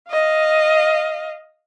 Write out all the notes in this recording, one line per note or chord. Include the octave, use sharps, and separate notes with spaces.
D#5 F5